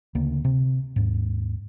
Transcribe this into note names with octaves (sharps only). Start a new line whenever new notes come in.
D2 C#3 A#3
C3
D#2 G#2